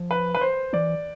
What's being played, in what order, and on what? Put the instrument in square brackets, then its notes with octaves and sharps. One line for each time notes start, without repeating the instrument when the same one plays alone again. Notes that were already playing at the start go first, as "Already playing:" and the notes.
Already playing: [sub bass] F3
[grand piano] B4
B4
C5
[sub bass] E3 [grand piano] D5